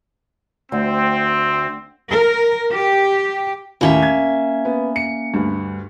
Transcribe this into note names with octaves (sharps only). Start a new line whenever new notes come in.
D2 C4
A#4
G4
D#2 A2 A#3 C#4 E5
G#6
B3
C#7
D2 G2